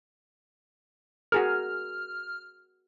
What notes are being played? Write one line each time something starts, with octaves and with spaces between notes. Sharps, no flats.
F#4 G#4 A#4 F6